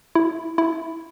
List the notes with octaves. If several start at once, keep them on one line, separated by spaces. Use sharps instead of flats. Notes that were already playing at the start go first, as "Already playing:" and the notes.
E4
E4